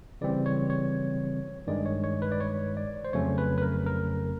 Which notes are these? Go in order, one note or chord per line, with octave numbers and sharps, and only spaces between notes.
C#3 E3 G3 C4 D5
C#5
C#5
G2 D#3 G#3 D5
C#5
C#5
B4
D5
C#5
D5
C5
F2 C#3 F#3 A3 C#4 C#5
B4
B4
A#4
A#4